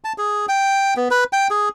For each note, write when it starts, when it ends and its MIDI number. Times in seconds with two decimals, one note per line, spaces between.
0.04 0.13 81
0.18 0.46 68
0.49 0.94 79
0.97 1.08 59
1.11 1.24 71
1.33 1.48 79
1.50 1.69 68